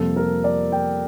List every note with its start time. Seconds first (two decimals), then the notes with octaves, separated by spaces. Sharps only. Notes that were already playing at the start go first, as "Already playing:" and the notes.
Already playing: F2 C3 G3 A#3 A4
0.16 A#4
0.44 D5
0.72 G5